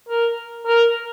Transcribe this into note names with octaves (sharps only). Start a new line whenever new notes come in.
A#4
A#4